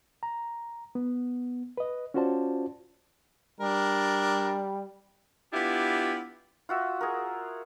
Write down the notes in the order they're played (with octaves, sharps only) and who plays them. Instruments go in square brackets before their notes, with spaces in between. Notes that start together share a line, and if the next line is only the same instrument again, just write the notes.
[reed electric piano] A#5
B3
B4 D#5
C#4 F4 F#4 C5 D5 A5
[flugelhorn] G3 [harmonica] D4 A#4
[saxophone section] B3 D4 E4 F4 G4
[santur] F4 F#4 E5
G#4 A#4